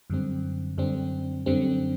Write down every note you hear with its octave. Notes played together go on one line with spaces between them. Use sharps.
F#2 D3 G3 C4
F#2 D3 G3 C4
F#2 D3 G3 C4